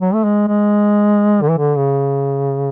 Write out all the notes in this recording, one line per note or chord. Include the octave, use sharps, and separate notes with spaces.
F#3
A3
G#3
G#3
D3
E3
D3
C#3